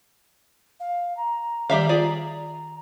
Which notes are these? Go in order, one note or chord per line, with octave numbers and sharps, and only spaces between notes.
F5
A#5
D#3 G3 E5 F5
F4 G#4 D5